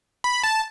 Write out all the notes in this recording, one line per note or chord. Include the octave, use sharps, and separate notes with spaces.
B5
A5